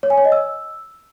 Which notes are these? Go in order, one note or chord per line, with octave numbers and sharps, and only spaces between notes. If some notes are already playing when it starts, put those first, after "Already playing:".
C#5
G#5
C#5
D#5
E6